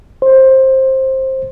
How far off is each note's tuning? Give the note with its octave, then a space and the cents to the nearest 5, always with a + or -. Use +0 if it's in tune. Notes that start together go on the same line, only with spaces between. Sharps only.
C5 +15